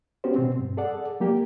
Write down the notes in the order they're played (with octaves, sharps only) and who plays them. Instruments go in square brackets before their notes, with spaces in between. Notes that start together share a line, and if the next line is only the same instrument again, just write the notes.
[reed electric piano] B3 C#4 F#4 G4 C5
B2 C4
G2
G#4 A4 D5 F#5
F#3 A#3 G4